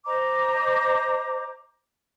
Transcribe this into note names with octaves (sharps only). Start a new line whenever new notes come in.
C5 D#5 A#5 D6